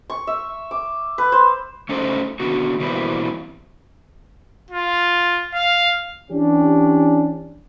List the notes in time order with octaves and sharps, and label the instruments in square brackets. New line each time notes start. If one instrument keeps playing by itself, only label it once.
[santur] C#6
E5
D6
B4
C5
[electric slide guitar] A3 C#4 D#4 A4 C5
D3 D#3 B3 F#4
B2 E3 G3 A#3 C4 E4
[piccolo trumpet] F4
F5
[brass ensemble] E3 C#4 D4 G4